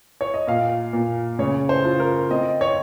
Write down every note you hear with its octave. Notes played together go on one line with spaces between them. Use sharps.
C#5
D#5
A#2 F5
A#2
C#3 C#5
C5
F4
A#4
C4 D#5
C#5